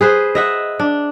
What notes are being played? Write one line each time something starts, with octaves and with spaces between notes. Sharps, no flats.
G#4 B4 C5
D#5 E5 F#5
D4